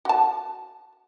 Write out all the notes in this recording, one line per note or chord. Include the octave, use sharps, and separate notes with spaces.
F#4 A5